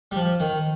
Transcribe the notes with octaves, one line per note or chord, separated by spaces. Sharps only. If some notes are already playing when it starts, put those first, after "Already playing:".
G3
F3
D#3